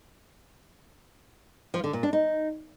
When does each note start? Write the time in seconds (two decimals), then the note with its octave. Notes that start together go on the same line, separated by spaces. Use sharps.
1.74 F3
1.84 D3
1.93 A#2
2.03 D4
2.13 D#4